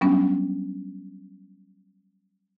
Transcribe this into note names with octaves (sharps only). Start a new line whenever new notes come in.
F#3 G3 B3 C#4 D4